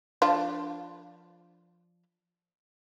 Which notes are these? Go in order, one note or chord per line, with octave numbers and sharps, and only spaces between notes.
F3 D4 F4